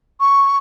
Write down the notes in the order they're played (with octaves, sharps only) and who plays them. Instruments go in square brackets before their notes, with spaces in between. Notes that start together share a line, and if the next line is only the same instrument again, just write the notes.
[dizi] C#6